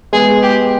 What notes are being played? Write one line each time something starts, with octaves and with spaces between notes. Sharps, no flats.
G#3 B3 G#4
G4